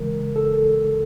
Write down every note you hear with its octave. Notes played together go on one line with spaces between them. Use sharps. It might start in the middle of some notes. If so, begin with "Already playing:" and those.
Already playing: D#2 C#3 E3 G#3 A#4
A4